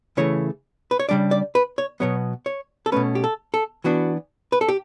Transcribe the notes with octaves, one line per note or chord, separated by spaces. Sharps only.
C#3 E3 A3 C#5
B4
C#5
C#3 G3 D4 D5
D5
B4
C#5
B2 F#3 B3 C#5
C#5
A4
B2 A3 C#4 B4
G4
A4
A4
E3 B3 D4 F#4
B4
A4
G4